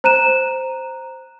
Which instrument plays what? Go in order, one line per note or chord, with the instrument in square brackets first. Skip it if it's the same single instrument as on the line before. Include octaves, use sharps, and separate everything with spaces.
[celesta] C5 A#5 F#6 D#7 E7